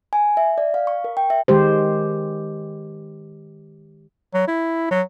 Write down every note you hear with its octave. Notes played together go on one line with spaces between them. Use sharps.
G#5
E5
D5
F5
C#6
A#4
G5
E5
D#3 G#3 G4 C5
F#3
E4
F#3